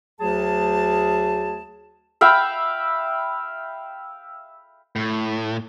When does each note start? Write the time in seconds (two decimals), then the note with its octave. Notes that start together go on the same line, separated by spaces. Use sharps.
0.20 D2 F#3 G#4 A5
2.21 E5 F5 G5 B5
4.96 A2